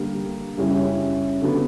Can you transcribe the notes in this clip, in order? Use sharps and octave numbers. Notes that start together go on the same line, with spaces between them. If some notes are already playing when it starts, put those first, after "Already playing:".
Already playing: D3 G3 A#3
F#2 C#3 G3 C#4 E4
D3 F#3 B3